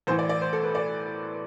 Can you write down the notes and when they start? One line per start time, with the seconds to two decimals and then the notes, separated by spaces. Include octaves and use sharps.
0.07 A1 A2 E3 C5
0.19 D5
0.29 D5
0.41 C5
0.53 A4
0.63 B4
0.75 D5